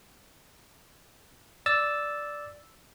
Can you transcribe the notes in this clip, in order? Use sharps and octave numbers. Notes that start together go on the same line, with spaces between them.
D5 E6 A6